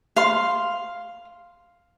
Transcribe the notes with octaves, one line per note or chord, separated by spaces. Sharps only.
F5 C6